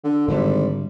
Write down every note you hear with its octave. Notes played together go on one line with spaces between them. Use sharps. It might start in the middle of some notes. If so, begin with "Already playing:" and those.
D3
G#1 G#2 D3 G3